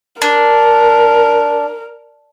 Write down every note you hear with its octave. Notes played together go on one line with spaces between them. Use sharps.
D4 A#4